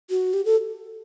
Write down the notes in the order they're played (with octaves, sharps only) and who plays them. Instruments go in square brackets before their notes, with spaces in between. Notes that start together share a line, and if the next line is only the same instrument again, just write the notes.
[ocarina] F#4
G4
A4